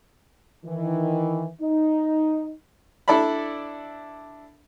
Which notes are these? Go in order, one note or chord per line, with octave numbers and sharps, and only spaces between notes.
D#3 E3
D#4
D4 E4 A4 D5 A5 B5